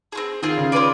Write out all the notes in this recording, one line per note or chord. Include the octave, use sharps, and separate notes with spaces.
C4 F4 G#4
D#3 C4 F4 G#4
C#3
F4 G#4 B4 D5